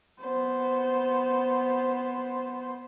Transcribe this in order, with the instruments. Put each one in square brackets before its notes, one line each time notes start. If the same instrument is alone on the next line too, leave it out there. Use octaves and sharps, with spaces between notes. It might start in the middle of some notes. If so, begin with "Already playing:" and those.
[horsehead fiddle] B3 C5